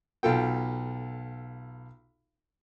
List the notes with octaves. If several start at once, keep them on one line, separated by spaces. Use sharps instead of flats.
B1 F4 A4 G5